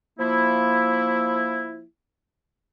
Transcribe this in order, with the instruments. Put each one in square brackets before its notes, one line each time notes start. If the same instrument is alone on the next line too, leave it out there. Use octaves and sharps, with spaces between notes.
[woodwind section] F3 A#3 E4